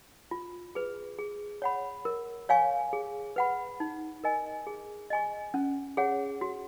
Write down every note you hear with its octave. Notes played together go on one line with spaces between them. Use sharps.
F4
G#4 B4
G#4
C#5 F#5 B5
A#4
C#5 F5 G#5 C#6
G#4
B4 F#5 B5
D#4
A#4 D#5 G#5
G#4
D#5 G#5 C#6
C#4
G#4 C#5 F#5
F#4